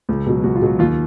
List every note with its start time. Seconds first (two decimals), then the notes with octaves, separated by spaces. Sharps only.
0.09 C#2
0.26 B2 F#3
0.43 C#2 F#4
0.56 F4
0.62 B2 F#3 F#4
0.79 D#2 F4